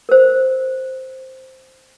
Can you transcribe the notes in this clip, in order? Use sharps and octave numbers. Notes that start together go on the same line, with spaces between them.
A#4 C5